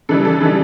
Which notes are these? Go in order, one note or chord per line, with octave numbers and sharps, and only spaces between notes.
C#3 E3 G3 A4
A4
C#3 E3 G3